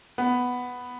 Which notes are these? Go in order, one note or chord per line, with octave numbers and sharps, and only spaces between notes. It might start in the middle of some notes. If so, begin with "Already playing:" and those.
B3